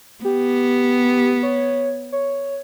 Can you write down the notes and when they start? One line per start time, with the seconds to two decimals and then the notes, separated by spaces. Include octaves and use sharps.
0.24 B3 G4
1.43 C#5
2.12 C#5